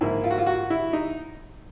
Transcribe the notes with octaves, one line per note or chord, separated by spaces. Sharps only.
G#2 F3 A#3 E4
F4
F#4
F4
F#4
E4
D#4